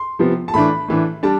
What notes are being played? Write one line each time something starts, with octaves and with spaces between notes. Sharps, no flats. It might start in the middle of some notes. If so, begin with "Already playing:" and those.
Already playing: C6
C3 F3 B3
A5
A2 E3 A3 D4 B5
A2 E3 A3 D4
G3 D4 A5